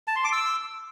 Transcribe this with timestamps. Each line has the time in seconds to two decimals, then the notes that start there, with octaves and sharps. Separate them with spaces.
0.08 A5
0.16 C6
0.24 D6
0.33 E6